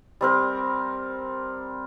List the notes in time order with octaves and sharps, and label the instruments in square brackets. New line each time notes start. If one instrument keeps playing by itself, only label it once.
[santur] G3 C4 A#4